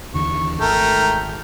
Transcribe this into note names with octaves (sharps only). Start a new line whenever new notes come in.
D#2 D3 E3 C#6
G#1 A3 A#4 G5